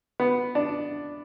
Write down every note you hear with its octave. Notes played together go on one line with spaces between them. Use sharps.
B3
D4